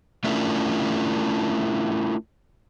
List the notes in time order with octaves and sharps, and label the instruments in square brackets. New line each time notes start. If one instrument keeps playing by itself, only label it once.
[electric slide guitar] A3 C#4 D4 E4 F4 A#4